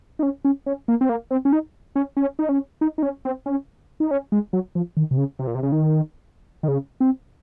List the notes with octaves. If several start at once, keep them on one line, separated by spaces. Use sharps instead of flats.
D#4
C#4
C#4
C#4
A#3
C4
A#3
C4
C#4
D#4
C#4
C#4
D#4
C#4
D#4
D#4
C#4
C4
C#4
D#4
C#4
G#3
F#3
F3
D#3
C3
C#3
C3
A#2
C3
C#3
D#3
D#3
C#3
C4